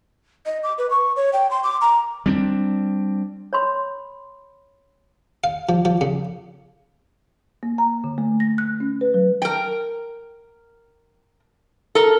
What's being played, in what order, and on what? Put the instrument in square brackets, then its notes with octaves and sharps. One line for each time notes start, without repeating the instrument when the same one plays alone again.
[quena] D#5
D6
B4
C#6
C#5
G5
C6
D6
A#5
[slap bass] G3 C4 D4
[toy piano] C#5 B5 C6
[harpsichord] F5
F3
F3
C#3
[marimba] A#3
A#5
D3
A3
A#6
F#6
C#4
B4
F#3
[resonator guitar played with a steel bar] A#4 G5
A4 A#4